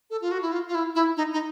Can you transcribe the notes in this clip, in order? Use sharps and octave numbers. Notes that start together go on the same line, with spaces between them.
A4
F4
F#4
E4
F4
F4
E4
E4
D#4
D#4